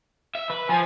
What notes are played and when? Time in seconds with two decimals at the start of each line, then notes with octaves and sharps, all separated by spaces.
0.35 E5
0.50 B4
0.69 F3 G#5